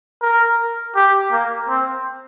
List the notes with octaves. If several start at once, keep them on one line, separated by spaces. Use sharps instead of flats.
A#4
G4
A#3
C4